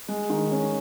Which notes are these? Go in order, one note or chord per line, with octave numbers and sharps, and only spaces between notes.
G#3
D#3
C#4